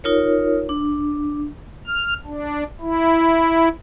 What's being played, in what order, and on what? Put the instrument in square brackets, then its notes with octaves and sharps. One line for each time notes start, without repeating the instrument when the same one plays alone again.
[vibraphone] D#4 F4 A#4 C#5
D4
[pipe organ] F6
D4
E4